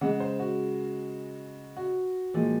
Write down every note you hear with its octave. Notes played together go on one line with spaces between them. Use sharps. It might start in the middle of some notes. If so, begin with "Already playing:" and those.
C#3 G#3 F#5
C5
F#4
F#4
A#2 F3 G#3